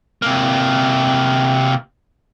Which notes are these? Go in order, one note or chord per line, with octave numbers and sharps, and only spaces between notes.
C3 A#3